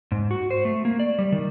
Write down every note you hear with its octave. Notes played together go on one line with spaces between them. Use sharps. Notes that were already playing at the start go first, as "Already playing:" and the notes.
G#2
F#4
C5
A3
A#3
D5
G3
D#3